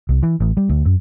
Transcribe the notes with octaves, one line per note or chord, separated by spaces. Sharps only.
C2
E3
A1
G3
D2
F#2